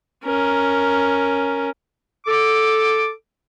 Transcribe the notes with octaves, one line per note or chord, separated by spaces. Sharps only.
C#4 A#4
A4 D6